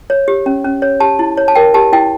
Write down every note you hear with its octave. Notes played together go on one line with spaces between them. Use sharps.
C#5
G4
C#4
C#4
C#5
G4 A5
E4
C#5
A5
A#4 G5
G4 A5
E4 G5